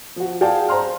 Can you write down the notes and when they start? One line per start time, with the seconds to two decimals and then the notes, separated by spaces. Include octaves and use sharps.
0.16 F3 F#4
0.41 F#4 G#4 D5 F5 G5 A5
0.68 C5 A#5 C6 F6